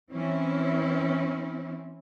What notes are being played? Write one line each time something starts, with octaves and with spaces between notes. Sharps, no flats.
E3 C4 C#4 E4